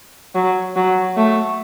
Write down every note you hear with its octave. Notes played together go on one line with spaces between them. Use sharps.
F#3
F#3
A3